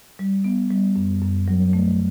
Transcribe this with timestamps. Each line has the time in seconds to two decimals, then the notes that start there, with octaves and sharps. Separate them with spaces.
0.19 G3
0.44 B3
0.70 G3
0.96 F#2
1.22 F#2
1.48 F#3
1.73 A3